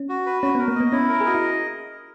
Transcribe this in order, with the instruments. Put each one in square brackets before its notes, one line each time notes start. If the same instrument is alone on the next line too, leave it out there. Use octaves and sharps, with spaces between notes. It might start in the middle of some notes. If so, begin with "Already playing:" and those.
Already playing: [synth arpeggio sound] C#4
[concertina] F#4
B4
[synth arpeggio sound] C#4 [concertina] F#4
[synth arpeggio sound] B3
[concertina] A#4
[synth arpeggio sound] A#3
[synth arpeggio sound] B3 [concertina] D#5
[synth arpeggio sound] C#4 [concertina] E4
[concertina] A#4
[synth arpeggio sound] G#4
[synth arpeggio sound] F#4 [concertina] D#5
[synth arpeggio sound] E4